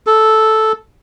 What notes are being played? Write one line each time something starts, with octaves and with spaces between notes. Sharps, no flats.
A4